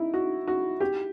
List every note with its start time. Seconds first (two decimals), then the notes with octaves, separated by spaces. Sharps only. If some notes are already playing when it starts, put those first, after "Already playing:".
Already playing: D#4 E4
0.14 F#4
0.48 F#4
0.80 G4